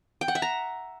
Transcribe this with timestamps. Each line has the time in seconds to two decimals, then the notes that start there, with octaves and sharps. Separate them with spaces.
0.21 G5
0.28 F#5
0.35 E5
0.42 A#5